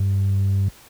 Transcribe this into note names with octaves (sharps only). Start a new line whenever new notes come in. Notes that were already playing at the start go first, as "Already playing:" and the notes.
Already playing: G2